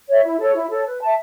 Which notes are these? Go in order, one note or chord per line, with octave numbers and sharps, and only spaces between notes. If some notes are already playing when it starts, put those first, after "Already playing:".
C#5 E5
E4
A4 C#5
E4
A4 C#5
B4
E5 A5